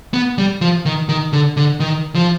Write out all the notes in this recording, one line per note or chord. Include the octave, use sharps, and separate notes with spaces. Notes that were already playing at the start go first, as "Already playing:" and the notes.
B3
G3
F3
D#3
D#3
D3
D3
D#3
F3